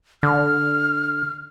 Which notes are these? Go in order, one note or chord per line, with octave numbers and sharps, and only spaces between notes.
D3 F6